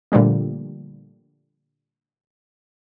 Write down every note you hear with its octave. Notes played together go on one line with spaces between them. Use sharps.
A#2 D3 F3 G3 A3